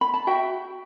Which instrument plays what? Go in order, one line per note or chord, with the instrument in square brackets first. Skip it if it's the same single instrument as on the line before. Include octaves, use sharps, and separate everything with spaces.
[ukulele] B5
A5
F#4 E5 G5